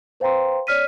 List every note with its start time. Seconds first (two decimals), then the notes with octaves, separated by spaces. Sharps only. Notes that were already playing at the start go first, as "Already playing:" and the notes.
0.20 B4 C5 F5 G5 A#5 C6
0.67 C#5 D5 F6 B6 D#7